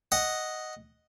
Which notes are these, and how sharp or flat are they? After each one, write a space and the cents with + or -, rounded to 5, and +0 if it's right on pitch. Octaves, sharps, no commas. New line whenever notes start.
D#5 +0 F#5 +0